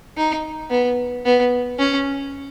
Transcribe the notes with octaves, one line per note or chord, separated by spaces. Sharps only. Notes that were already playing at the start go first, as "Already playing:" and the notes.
D#4
B3
B3
C#4